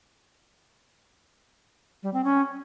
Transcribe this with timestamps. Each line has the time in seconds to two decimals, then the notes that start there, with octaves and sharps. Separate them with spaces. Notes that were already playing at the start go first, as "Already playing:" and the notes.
2.03 G3
2.14 C4
2.24 C#4